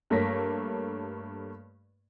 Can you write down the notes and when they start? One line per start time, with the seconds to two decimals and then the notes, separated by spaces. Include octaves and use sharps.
0.10 G2 A3 A#3 C#5 A#6 B6